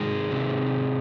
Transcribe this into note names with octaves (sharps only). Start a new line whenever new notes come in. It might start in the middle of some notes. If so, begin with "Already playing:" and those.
Already playing: C3 D#3 G#3
C3